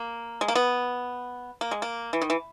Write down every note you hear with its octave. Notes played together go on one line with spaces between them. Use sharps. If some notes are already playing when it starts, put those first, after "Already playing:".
Already playing: A#3
G#3
A#3
B3
A#3
G#3
A#3
E3
D#3
E3